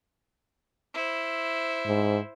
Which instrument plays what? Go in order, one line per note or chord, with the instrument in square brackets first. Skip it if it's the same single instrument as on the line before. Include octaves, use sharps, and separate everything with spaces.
[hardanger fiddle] E4 C5
[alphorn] G#2